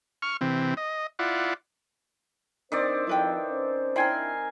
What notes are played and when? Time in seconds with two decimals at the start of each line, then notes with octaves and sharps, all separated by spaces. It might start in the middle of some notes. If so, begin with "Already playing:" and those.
0.22 C#6 F6
0.41 C3 E3 C4
0.77 D#5
1.19 E4 F4 D5 F#5
2.72 D#3 C4 D4 C5 D5
3.07 F2 E4 B4 G5
3.48 C#4 C5
3.96 D4 E4 A#4 G5 G#5 C6